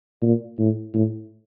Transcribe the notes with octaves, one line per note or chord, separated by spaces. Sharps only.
A#2
A2
A2